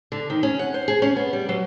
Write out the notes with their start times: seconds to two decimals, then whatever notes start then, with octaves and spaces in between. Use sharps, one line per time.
0.12 D3
0.30 D#3
0.43 C#4
0.59 F#5
0.74 C5
0.88 G#4
1.02 C#4
1.16 B3
1.33 G3
1.49 F#3